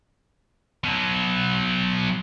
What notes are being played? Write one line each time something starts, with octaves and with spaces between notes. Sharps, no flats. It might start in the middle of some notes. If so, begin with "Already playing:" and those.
B2 F#3